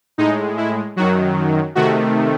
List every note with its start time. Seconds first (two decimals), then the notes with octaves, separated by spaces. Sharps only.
0.18 A2 G#3 D#4
0.57 E4
0.96 F#2 D#3 F#3 F#4
1.75 C3 D#3 A3 F#4